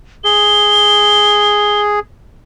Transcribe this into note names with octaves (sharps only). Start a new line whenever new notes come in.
G#4 G7